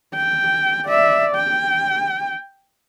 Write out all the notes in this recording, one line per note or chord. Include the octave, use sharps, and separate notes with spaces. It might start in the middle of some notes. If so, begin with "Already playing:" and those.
G5
D5 E5
G5